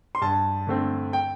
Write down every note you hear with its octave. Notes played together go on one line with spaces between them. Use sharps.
C6
G2 A5
D3 A3 C4
G5